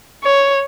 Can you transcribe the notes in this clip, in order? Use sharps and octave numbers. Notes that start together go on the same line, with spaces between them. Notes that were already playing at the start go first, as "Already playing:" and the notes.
C#5